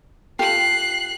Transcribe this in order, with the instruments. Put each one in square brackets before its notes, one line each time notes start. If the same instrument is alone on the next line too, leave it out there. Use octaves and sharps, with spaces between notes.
[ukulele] F4 G4 A4 [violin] F#6 C7